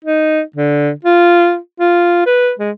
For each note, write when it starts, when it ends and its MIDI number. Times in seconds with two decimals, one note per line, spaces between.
0.05 0.41 63
0.56 0.91 50
1.05 1.57 65
1.80 2.23 65
2.26 2.52 71
2.60 2.71 56